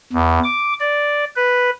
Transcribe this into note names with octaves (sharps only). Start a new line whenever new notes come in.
E2
D6
D5
B4